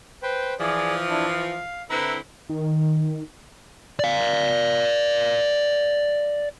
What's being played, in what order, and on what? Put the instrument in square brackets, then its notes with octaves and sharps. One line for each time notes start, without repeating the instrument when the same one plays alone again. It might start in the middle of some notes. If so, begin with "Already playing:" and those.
[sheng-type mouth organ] B4 C5 G5
[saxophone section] E3 F3 [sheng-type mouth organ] G#4 D5
[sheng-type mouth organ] D4 E4
F5
[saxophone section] D3 C4 E4 [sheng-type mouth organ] B4 A#5 E6
[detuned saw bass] D#3
[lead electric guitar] D5 F5